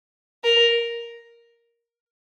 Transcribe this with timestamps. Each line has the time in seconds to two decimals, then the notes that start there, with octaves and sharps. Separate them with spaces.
0.44 A#4